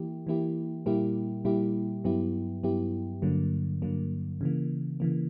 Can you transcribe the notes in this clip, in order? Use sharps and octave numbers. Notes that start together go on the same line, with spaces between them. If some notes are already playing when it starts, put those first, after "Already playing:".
Already playing: E3 A#3 E4 G4
E3 A#3 E4 G4
A#2 G3 A#3 E4 G4
A#2 G3 A#3 E4 G4
G2 F#3 B3 E4 G4
G2 F#3 B3 E4 G4
G2 D3 F#3 A#3
G2 D3 F#3 A#3
C#3 E3 A#3
C#3 E3 A#3